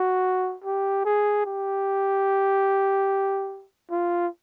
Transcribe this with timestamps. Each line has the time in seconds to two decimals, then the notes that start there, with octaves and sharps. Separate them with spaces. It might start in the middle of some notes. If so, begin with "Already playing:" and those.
Already playing: F#4
0.64 G4
1.05 G#4
1.46 G4
3.91 F4